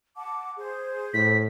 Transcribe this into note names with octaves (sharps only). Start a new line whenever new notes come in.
F#5 A5 D6
G#4 C5
A2 B6